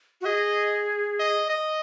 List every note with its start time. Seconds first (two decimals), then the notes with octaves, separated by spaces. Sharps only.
0.21 F#4
0.25 G#4 D#5
1.20 D#5
1.50 D#5